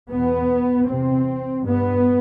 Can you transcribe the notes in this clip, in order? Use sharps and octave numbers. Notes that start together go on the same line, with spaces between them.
E2 B2 B3
E2 C3 C4
G2 B3